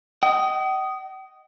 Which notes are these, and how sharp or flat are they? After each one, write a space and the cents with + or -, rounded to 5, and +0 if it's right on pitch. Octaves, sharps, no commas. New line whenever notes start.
D#5 +0 G5 -45